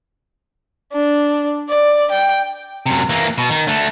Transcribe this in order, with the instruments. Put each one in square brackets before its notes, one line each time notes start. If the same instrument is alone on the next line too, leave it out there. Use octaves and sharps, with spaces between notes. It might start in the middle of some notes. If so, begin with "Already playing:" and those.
[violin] D4
D5
G5
[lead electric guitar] F#2 C3
E3 A#3
B2
D#3
D3 A3